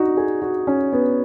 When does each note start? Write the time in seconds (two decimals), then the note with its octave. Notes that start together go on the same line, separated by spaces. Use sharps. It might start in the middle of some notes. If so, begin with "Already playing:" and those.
Already playing: D#4 F#4
0.17 G#4
0.42 F#4
0.67 C#4
0.93 B3